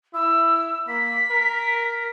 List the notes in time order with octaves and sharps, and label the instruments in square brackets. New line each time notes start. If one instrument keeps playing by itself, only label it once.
[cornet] E4 [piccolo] E6
[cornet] A#3 [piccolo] B6
[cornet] A#4